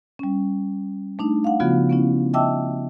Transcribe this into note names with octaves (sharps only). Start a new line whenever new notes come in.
G3 C#4
A3 D4 D#4
F5 F#5
C#3 F3 B3 F4 F#4
B3 C#4 E4
D#5 E5 G5 A5 D6 E6